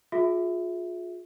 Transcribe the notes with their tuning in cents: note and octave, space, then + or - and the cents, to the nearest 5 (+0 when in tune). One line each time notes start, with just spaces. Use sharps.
F4 +30 G#4 +15 E5 +0